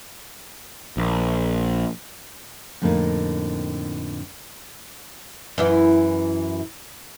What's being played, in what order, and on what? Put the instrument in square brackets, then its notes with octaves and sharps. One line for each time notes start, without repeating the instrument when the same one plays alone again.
[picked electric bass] A#1
[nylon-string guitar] F2 A2 D3 A#3 D4 D#4
[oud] F#2 E3 E4